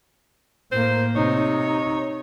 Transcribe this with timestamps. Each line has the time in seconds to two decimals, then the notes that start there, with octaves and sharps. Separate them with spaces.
0.72 A2 A#3 C5
1.16 C3 D#4 C#5